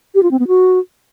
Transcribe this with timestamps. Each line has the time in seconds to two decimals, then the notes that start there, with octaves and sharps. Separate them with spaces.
0.15 G4
0.23 F4
0.31 C4
0.39 B3
0.48 F#4